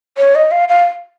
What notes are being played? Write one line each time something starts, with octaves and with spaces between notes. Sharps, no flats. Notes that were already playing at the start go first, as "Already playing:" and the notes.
C#5
D#5
F5
F5